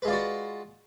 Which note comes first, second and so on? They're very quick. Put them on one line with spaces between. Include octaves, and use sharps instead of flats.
B4 G#3 F4 D5 F#4